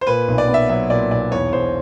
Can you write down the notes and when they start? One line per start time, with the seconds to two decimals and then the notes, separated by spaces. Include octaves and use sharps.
0.01 C5
0.07 A#2 B4
0.28 B1
0.38 D5
0.48 B3
0.54 E5
0.69 F#3 E5
0.90 A#2 D5
1.11 B1 D5
1.32 E2 C#5
1.52 E1 C5